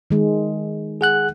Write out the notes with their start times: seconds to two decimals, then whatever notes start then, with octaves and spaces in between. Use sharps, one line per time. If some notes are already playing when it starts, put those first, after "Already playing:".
0.11 D#3 G#3
1.01 G#4 F#5 F#6